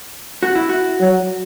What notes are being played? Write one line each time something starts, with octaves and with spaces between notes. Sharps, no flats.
F#4
E4
F#4
F#3